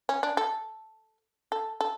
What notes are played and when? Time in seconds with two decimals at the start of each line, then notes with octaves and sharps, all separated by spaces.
0.09 C#4
0.23 D4
0.37 A4
1.52 A4
1.81 A4